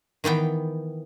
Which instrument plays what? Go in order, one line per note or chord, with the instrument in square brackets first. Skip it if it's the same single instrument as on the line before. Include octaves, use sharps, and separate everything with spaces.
[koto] D#3 E3 B3 G5